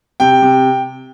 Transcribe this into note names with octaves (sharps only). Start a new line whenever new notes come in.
C3 G5
C3